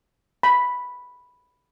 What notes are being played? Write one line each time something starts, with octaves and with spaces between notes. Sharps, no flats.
B5